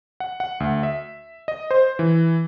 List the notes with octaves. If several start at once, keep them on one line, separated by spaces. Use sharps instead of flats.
F#5
F#5
D2
E5
D#5
C5
E3